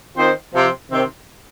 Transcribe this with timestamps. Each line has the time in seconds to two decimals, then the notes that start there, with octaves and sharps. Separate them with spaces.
0.17 D#3 C4 F4 C5
0.54 C3 F3 C4
0.90 C3 D#3 C4